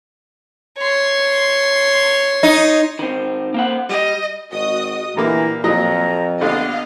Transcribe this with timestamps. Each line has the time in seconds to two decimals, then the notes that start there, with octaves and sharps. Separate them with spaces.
0.79 C#5 C6
2.43 D#4
2.99 D#3 C4
3.54 A#3 C5 F#5
3.89 G3 G4 D#5
4.51 G#1 F#4 D#5 D#6
5.17 A#2 D3 E3 G3 A#3 A#5
5.64 F2 F#3 D#5 A#5
6.41 A#1 D3 G3 B3 D4 D#5 F5